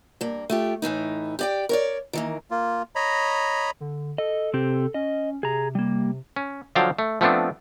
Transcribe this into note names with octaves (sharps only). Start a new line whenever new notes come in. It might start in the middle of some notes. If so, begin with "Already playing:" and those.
G2 A#3
A3 F4 G4
A2 E3 A3 D#4
G4 D5 G5
A#4 C#5 D5
D#3 E3 A#3
A#3 F4
C#5 D#5 A#5 B5
D3
A4 D#5
C3 C4 G4
C#4 D#5
C3 G#4 A#5
G3 A#3
C#4
D3 F3 F#3 F5 G5 A5
A3
F3 A3 B3 C4 D4